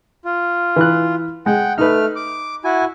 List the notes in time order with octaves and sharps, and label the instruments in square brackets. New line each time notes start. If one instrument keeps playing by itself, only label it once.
[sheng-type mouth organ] F4
[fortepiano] E3 F#6
[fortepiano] G#3 [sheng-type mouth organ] F#5 G5
[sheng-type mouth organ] A3 F6 [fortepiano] D#4 B4
[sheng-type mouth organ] D6
E4 F#4 G#5